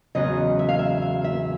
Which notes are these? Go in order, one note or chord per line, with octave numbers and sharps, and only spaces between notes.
E2 C#3 F#3 D#5
E5
F5
E5
F5
E5